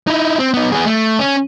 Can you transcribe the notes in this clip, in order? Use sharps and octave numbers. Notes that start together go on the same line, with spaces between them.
D#4 E4
C4
B3 D#4
B3 G#4
A3
C#4